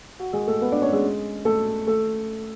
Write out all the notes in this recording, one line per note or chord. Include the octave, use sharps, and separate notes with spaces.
F#4
G#3 G#4
A3 A4
B3 B4
D4 D5
C#4 C#5
G#3 G#4
A3 A4
A3 A4